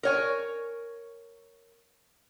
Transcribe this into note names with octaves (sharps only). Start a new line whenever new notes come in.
A#4 C#5 G#5